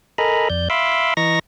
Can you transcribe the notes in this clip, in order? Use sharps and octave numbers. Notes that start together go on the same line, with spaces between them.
A4 A#4 D#5 G#5 A#5 B5
F2 D5 G6
E5 F5 B5 C6 D6 E6
E3 D#5 A#5 C#6 A#6